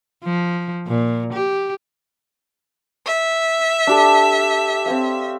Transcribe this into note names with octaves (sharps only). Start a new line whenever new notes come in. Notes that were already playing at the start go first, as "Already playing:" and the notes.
F3
A#2
G4
E5
D4 G4 A4
C4 C#5 F5